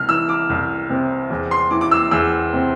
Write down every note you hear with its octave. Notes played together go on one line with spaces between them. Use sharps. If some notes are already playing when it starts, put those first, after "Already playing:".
Already playing: C2 F6
E3 E6
D6
C2
C3
E2
C6
E3 D6
D6
E6
E2 E6
C3